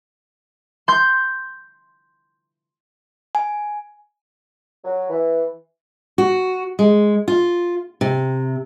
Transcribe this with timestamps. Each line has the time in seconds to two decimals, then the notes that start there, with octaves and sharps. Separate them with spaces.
0.88 C6 G6
3.35 G#5
4.84 F#3
5.10 E3
6.18 F#4
6.79 G#3
7.28 F4
8.01 C3